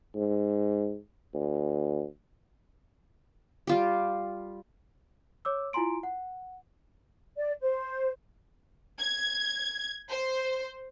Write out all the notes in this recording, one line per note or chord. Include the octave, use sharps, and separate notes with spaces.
G#2
D2
G3 F4 G4
C#5 D6 E6
E4 F4 G#5 A#5 C6 D7
F#5
D5
C5
G#6
C5